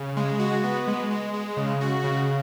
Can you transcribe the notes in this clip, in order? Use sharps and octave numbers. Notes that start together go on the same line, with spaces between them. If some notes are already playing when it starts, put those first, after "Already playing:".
Already playing: C#3
G#3
F#4
B3
G#3
G#3
G#3
C#3
F#4
C#3